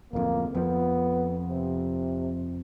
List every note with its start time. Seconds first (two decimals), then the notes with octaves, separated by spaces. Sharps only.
0.13 D1 F2 A#3
0.55 F2 F3 B3
1.48 C3